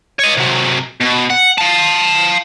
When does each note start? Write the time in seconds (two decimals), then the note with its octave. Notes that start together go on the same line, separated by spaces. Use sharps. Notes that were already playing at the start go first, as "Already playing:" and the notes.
0.19 C#5 D#5
0.37 C3 F#3
1.01 B2
1.30 F#5
1.58 F5 A5